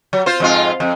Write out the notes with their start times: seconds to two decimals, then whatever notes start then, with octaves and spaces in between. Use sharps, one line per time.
0.13 F#3
0.26 F4 C5
0.40 F2 G#2 F4
0.80 F2